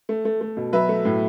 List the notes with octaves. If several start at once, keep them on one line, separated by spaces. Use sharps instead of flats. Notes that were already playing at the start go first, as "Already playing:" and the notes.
A3
A3
A3
B2
F#3 B4 E5
A3
A2